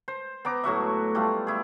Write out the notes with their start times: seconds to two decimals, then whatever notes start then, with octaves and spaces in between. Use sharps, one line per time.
0.08 C5
0.45 B3 A#5 D6
0.64 A2 F#3 F#4 E5
1.15 G3 A3 F4
1.47 E4 G#4